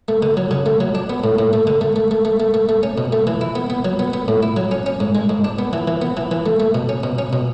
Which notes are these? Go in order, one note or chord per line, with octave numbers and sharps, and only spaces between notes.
A3
D3
F#3
C#3
A3
F#3
D4
B3
A2
A2
A3
D3
A3
A3
A3
A3
A3
A3
A3
C#4
B2
A3
E3
E4
B3
B3
F#3
B3
B3
A2
E4
F#3
C#4
C#4
G#2
G#3
G#2
D4
B3
E3
E3
B3
E3
E3
A3
A3
B2
C#4
B2
C#4
B2